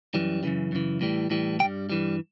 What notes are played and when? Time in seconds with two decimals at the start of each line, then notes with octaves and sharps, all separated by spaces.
0.14 F#2 E3 G3
0.43 F#2 C#3 E3
0.72 F#2 C#3 E3
1.01 A2 E3 G3
1.30 A2 E3 G3
1.60 E3 G3 G5
1.64 G2
1.90 G2 E3 G3